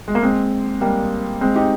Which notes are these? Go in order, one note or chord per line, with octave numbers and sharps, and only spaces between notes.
G#3
A#3
G#3 C4
G3 A#3
G#3 C4
D#4 G4